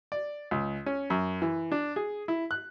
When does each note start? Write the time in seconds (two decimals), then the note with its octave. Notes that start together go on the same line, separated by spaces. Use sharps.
0.12 D5
0.51 C#2
0.86 C#4
1.10 F#2
1.42 E3
1.72 D4
1.96 G#4
2.28 E4
2.51 F#6